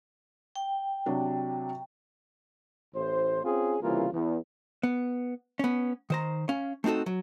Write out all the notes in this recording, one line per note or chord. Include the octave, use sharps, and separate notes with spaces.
G5
C3 F#3 D4
A1 A2 C5
C4 C#4 F4 G#4
C2 C#3 E3 A#3 F4
E2
B3
B3 C#4
D#3 C5 A#5
C#4 F5
A3 C4 D#4 F#4 A4
F#3